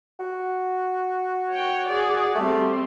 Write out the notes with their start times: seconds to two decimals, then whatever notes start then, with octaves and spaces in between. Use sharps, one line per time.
0.20 F#4
1.51 C#5 G5
1.86 G#4 D5
2.35 G3 A3 C4